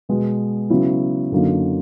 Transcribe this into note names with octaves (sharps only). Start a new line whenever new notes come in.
B2 G#3 B3
C#3 F#3 B3 E4
F#2 D3 F#3 A#3 D#4